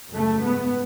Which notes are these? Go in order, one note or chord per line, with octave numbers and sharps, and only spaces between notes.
F#2 C#3 A3
G#2 B3